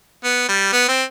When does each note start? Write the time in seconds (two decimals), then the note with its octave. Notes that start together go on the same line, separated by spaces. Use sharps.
0.24 B3
0.49 G3
0.73 B3
0.88 C4